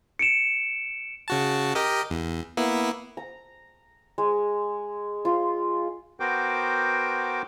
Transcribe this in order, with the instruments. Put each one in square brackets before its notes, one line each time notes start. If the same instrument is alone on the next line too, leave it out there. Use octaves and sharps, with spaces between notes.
[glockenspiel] C#7 D7 E7
[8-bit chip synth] C#3 F#4 A5
G4 A#4 D#5
E2
A#3 B3 E4
[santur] A#5
G#3
F4
[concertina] B3 F#4 A#4 C5 G5 D6